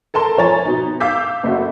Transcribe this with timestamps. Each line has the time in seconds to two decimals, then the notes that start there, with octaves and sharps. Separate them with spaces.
0.14 A4 A#4 A5 C6
0.38 F3 C#5 G#5 A#5 A6
0.65 B2 D#4
1.00 F5 D6 E6 G6 B6
1.43 F#1 A3 F#4